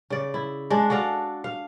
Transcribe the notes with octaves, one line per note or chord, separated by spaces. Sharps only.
C#3 D5
E4
G#3 D4
F#4 A4 D5 F5
F5